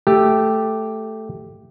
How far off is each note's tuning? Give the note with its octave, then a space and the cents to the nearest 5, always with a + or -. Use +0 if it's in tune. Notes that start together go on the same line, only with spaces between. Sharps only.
A3 +0 G4 +0